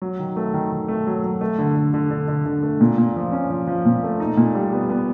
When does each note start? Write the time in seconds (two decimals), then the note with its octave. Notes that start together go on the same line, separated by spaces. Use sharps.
0.02 F#3
0.19 D#3
0.36 A3
0.54 D#3
0.72 D#3
0.88 A3
1.07 F#3
1.24 F#3
1.41 A3
1.58 D3
1.76 D3
1.94 D3
2.10 D3
2.28 D3
2.46 D3
2.63 A3
2.81 A#2
2.98 A#2
3.16 F3
3.32 C#4
3.50 F3
3.67 F3
3.85 A#2
4.03 A3
4.20 D#4
4.37 A#2
4.55 G3
4.73 B3
4.89 B3